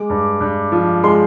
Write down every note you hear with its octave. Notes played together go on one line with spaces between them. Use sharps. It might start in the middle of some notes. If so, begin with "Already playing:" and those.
Already playing: G#3 D6
G2
G2
F3
G#3 C6